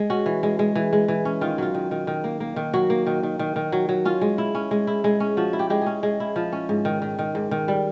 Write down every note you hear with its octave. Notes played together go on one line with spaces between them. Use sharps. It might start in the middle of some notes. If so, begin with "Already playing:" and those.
Already playing: G#3
C#4 F#4
E3
G#3
G#3
E3
G#3
E3
C#4
D#3 F4
F#3 F4
D#3
D#3
D#3
A#3
A#3
D#3
F#3 F#4
A#3
D#3
D#3
D#3
D#3
F#3
F#3
C#4 F4
G#3
E4
C#4
G#3
E4
G#3
C#4
F3 F#4
E4
G4
G#3 G4
G#4
C#4
G#3
E4
F3
C#4
G#2
D#3
D#3
D#3
G#2
D#3
G3